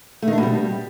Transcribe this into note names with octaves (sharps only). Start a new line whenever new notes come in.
A3
D#3
D4
B2
G3